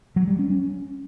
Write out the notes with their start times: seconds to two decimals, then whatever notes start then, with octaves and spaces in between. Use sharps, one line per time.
0.16 F#3
0.28 G3
0.39 C#4
0.50 C#4